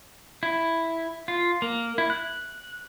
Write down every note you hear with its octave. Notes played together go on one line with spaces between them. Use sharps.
E4
F4
A#3
E4
F#6